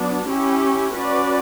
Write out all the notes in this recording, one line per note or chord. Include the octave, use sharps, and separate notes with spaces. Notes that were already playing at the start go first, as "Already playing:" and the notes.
Already playing: F#3 B3 D4
C#4 E4 G4
C#4 F#4 B4 D5